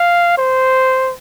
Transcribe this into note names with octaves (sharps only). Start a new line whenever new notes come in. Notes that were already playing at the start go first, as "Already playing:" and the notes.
Already playing: F5
C5